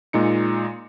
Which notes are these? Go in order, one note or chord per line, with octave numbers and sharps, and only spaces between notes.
A#2 G#3 D#4 C#7